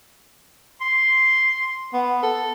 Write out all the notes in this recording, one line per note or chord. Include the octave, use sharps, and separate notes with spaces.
C6
B3
A4